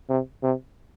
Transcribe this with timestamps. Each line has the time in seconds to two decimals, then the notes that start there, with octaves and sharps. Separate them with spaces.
0.10 C3
0.43 C3